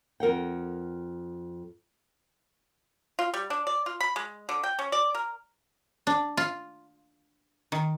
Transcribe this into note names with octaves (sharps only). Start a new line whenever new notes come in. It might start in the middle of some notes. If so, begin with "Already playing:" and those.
F2 A#4 F#5 G5
F4
G3
D4
D5
F4
B5
G#3
D3
G5
C#4
D5
A#4
D4
F4
D#3